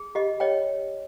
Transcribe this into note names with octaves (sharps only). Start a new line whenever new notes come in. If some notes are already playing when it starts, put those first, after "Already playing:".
Already playing: G#4
G4 D#5
C#5 D#5 G5